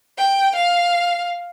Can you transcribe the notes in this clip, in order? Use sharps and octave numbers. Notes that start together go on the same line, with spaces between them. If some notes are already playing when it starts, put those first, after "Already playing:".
G5
F5